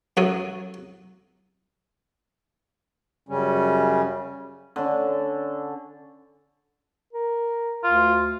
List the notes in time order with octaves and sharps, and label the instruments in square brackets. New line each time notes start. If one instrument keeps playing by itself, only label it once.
[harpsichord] F#2 F#4 A4 A#4 C#5 D#6
[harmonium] F#2 C#3 G3 C#4
[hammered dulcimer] D3 C#4
[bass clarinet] A#4
[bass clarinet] D2 [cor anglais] F4